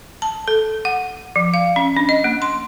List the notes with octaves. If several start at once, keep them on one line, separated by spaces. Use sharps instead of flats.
A5
A4
F#5
F3
F5
C#4
D4
D#5
A#3
C6